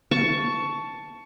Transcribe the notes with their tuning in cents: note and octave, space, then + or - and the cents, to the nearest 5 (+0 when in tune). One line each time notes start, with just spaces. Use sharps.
A5 +0 C#6 +15